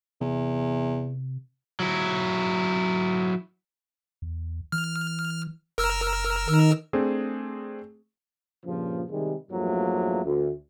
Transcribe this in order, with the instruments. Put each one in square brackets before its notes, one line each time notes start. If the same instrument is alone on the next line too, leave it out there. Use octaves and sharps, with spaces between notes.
[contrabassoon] E2 [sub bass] C3
[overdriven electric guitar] F#3 E4
[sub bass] E2
[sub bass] E3 [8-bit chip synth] F6
[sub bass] F#1 [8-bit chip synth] A#4 E6 F6
[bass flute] D#3
[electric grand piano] A3 C4 D4 G#4
[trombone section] G2 A#2 C#3 F3
C3 D#3 G3 G#3
E2 G2 F3 F#3 A3 A#3
D2